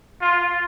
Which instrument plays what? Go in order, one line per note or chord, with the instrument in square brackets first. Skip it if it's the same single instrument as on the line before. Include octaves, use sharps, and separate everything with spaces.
[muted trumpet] F4